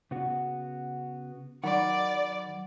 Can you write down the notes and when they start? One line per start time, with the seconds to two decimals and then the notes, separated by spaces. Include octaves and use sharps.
0.11 C#3 B3 F#4
1.64 D#3 F#3 D5 F#5 B5